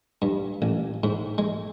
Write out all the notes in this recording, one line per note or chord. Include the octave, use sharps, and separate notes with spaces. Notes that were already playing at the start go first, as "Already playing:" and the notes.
G2
A1
G#2
G#3